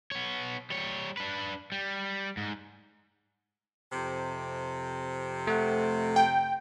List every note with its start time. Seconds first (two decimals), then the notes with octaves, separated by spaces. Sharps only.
0.12 B3 C#5
0.70 G3 C#5
1.17 D4 B4
1.72 G3
2.37 G#2
3.92 F2 C3
5.47 A3 F#5
6.16 G5